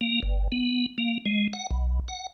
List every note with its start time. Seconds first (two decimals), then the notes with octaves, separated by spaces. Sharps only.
0.01 A#3
0.23 G1
0.52 B3
0.98 A#3
1.26 G#3
1.53 F#5
1.71 B1
2.08 F#5